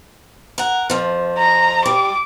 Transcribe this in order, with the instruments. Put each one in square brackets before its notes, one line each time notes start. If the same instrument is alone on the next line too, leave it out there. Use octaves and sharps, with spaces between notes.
[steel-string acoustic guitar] A#4 F#5
F2 F3
[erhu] A#5
[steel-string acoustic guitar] G3 [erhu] D6